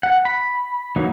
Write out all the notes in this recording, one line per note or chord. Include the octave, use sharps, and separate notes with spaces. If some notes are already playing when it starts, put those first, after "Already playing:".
F#5
B5
E3 F#3 A#3 D#4